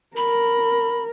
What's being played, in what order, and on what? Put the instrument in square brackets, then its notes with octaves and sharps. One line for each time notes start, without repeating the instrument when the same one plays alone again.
[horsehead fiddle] A#4 [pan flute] B5